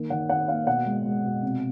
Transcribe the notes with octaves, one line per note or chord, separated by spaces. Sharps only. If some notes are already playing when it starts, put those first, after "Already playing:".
Already playing: D#3 A#3
D#3 F#5
D#3 F#5
A#3 F5
B2 F#5
G#3
G#3
B2
C3